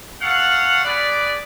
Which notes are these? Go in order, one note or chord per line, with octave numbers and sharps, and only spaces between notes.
A4 C#5 F5 F#5
G#4 B4 D5